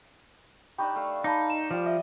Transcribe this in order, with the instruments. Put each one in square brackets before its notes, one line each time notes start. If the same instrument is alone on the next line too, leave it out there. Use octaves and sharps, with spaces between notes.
[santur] D4 D#4 G4 [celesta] G5 B5 C#6
[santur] A3 F5
[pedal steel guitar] D#4 [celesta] F5 A5 B5 [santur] D6
[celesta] E7
[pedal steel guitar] F3 [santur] G3 D5
[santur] D#5 [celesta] E5